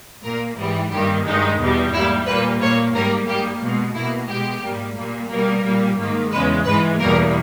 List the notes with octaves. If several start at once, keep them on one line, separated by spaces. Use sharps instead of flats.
A#2 A#3 A#4
G#2 E3 G3
G2 D#3 G3 A#3 G4
G2 D#3 G#3 D#4
E2 B2 G3
G#2 G3 A#3 E4
A#2 G3 A#3 B4
A#2 A#3 C#5
G#2 G3 A#3 A#4
G#2 G3 A#3 G4
B2 G#3
B2 A#3 E4
B2 G#3 G4
G#2 G3 A#3
A#2 G3 A#3
B2 G3 A#3 A#4
A#2 G3 A#3
G#2 D#3 A#3
E2 C#3 G#3 B4
G#2 E3 G#3 B4
E2 B2 G3 A#3 A#4